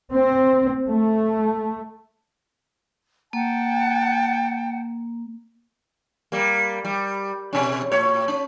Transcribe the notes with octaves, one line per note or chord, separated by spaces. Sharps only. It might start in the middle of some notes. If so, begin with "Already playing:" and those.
C4
A3
A#3 F#5 G5 A5
G3 A#3
G3
B2 C#4
A2 C#5
C#4